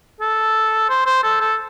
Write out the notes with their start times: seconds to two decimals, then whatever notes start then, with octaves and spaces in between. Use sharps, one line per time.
0.21 A4
0.90 C5
1.06 C5
1.24 A4
1.41 A4